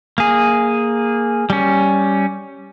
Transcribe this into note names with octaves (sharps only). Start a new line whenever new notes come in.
A#3 G#4
G3 C#4